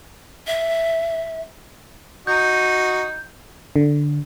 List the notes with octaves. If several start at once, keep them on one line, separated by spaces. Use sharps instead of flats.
E5
D#4 F#4 G6
D3